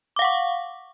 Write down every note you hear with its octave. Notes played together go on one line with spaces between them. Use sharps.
F5 F#5 C#6 D6